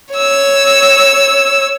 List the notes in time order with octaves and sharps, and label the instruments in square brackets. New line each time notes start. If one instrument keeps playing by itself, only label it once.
[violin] C#5 E6